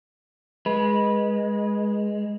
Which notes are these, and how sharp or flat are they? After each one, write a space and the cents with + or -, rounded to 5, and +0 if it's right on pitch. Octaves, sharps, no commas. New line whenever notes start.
G#3 +0 B4 -20